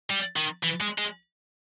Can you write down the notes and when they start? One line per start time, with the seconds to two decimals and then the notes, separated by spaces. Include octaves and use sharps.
0.10 G3
0.36 D#3
0.63 E3
0.81 G#3
0.98 G#3